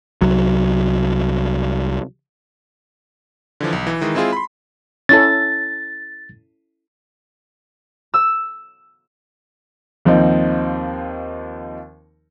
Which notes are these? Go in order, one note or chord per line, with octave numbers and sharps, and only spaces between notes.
C2 F#3
D3 E3 F3
B1
E3
D#3 E3 G#3
G#3 C4 E4 F4 G#4
B5 C6
C#4 E4 A4 A6
E6
D#2 F3 C4 D#4